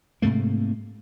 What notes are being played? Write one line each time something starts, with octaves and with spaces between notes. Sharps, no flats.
G#2 C3 A3 A#3